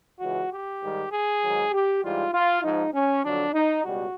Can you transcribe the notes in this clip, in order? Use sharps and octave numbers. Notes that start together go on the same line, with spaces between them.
C#2 C#3 E3 F#4
G4
G#2 D#3 G3
G#4
G#2 D#3 F#3
G4
G#2 E3 G3 F4
F4
G#2 F3 D#4
C#4
F2 D3 F#3 D4
D#4
C#2 B2 G3 F#4